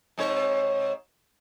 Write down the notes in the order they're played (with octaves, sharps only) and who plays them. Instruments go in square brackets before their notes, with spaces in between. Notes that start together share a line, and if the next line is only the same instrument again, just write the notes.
[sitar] G#2 C3 C#5